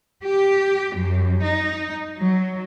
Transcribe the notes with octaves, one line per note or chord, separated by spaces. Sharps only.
G4
F#2
D#4
F#3